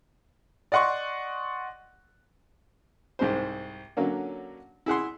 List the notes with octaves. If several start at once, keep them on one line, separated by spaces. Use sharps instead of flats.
D5 D#5 F#5 C6 C#6
C2 G#2 G#3 C5
D3 F#3 A#3 C#4
E4 G#4 F#5 C6